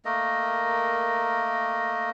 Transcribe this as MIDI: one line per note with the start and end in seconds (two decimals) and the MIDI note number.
0.05 2.10 57
0.05 2.10 58
0.05 2.10 70
0.05 2.10 75